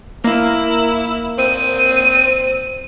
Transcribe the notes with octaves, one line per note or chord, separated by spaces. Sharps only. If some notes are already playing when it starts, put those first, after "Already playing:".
A#3 E4
C4 D#7